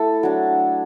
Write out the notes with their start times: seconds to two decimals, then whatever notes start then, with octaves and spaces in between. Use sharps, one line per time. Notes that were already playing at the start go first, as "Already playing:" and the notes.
Already playing: A3 E4 A4
0.23 F#3 D4